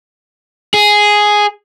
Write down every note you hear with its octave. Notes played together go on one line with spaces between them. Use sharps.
G#4